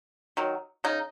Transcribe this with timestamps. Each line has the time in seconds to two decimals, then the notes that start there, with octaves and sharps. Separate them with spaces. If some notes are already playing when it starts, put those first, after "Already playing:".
0.37 D#3 F#3
0.84 C#3 D#4